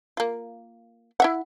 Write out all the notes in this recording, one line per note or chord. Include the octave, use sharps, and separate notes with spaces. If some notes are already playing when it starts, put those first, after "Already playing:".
A#3 F4
E4 E5 F#5